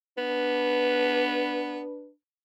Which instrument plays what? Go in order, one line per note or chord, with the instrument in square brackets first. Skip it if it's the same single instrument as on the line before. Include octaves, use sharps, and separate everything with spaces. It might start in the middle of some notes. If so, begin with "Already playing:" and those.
[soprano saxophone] B3 [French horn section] D4 B4